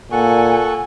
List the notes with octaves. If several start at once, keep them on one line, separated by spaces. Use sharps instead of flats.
A#2 A4 F#5 G#5 C#6